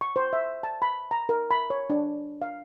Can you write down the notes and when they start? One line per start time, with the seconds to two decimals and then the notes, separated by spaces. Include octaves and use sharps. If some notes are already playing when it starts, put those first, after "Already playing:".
0.01 C#6
0.16 C5
0.33 E5
0.63 A5
0.82 B5
1.11 A#5
1.29 A#4
1.51 B5
1.70 C#5
1.90 D4
2.42 F5